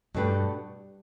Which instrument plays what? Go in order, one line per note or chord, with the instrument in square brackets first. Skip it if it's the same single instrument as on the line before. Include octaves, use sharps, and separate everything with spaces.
[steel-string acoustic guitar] G2 [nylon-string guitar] B2 A3 D4 G4 B4